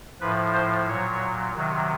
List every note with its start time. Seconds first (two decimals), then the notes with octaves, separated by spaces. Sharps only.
0.21 A2 F3 B4
0.54 C5
0.87 A#2 F#3 C#5
1.55 C3 D#3 F#3